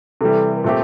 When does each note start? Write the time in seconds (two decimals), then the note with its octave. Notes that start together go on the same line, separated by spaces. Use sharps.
0.21 C3 E3 G3 A4
0.57 A#4
0.64 A#2 A3 C4 G4 A4